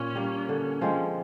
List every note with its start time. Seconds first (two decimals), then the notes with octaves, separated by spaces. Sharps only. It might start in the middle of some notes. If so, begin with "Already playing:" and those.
Already playing: A#2 C#4
0.15 G3 A#3
0.49 D3
0.81 F3 G#3 C4